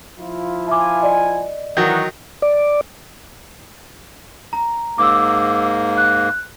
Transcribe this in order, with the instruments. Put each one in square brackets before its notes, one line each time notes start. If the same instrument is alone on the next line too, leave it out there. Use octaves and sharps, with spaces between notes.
[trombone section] F3 E4 F4
[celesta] E5 D6 [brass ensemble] G#5
[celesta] D5 D#5
[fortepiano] D#3 F#3 [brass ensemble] E3 D#4 F#4
[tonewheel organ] D5
[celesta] A#5
[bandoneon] G#2 A#3 [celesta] D6 E6
[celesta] F#6